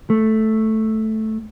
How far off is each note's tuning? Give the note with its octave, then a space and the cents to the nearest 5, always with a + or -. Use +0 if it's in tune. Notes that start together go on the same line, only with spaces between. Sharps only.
A3 -5